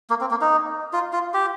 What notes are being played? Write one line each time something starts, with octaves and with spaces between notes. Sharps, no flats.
A#3
C4
A#3
D#4
F4
F4
G4